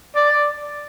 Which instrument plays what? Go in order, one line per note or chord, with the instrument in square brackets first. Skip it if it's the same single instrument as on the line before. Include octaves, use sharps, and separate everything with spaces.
[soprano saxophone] D5